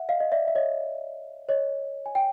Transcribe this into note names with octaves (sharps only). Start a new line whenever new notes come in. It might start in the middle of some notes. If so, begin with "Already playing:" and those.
Already playing: E5 F#5
D#5 F5
D#5
D5 E5
E5
C#5 D#5
C#5 D#5
G#5
G5